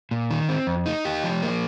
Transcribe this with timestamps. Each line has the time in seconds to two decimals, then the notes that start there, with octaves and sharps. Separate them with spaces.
0.11 A#2
0.31 D#3
0.49 C4
0.67 F2
0.86 D#4
1.05 G4
1.24 F3
1.43 A#3